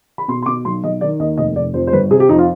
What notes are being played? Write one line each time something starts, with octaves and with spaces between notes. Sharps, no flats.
B5
B2 C6
C6
B2 D6
B1 C6
B1 D#5
D#3 D5
D#2 D#5
F1 D#5
F1 D5
F2 C5
C5
G1 B4
C3 G#4
G4
F2 D#4
F4